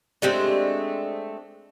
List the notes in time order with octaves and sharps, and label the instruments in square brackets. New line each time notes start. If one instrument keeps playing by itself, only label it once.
[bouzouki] G#3 A3 C4 [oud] D4 G4 C5